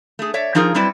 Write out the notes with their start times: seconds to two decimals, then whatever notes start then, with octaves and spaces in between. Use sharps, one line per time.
0.19 A3 G#4
0.34 C#5 D5 E5
0.55 F3 D#4 F4 G#4 A#4
0.74 F#3 G3 C4 E4 B4 D5